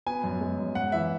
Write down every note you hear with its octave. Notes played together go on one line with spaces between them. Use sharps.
B3 G#5
F#2
G#3
F#2
G#2 F#5
E3 E5